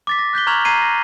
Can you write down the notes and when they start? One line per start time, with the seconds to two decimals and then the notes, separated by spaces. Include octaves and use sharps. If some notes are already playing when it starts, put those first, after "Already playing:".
0.07 D6 A6 B6
0.19 A#6
0.33 F#6 G6 B6 G7
0.47 A#5 C#6 F6 G#6 F7 F#7
0.65 A#5 G#6 C7 D#7
0.82 A#6